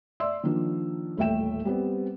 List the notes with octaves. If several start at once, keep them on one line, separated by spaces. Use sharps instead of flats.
D5 E5 C6 E6
D#3 F3 A#3 D4 F4
D#1 A1 A3 E5 G5 E7
G3 B3 C4